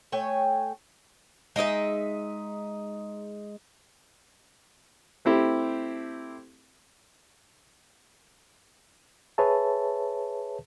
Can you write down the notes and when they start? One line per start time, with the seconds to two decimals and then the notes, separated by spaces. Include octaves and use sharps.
0.12 A3 C#5 G5 G#5
1.56 G#3 D#4 D#5 E5
5.25 A3 C4 E4 G4
9.38 G#4 B4 C#5 E5 A5